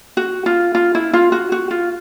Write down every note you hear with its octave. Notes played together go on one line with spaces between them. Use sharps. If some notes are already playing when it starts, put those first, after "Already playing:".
F#4
F4
F4
E4
F4
F#4
F#4
F4